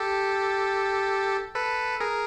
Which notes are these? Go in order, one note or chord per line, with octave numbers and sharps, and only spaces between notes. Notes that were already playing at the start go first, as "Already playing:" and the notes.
Already playing: G4 A4
A4 B4
G#4 A#4